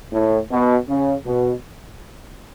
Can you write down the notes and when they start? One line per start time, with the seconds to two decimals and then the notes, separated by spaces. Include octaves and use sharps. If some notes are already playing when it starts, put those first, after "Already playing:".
0.12 A2
0.50 B2
0.88 C#3
1.26 B2